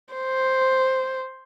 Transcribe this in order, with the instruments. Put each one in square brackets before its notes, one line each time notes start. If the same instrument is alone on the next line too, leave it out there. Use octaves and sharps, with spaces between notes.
[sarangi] C5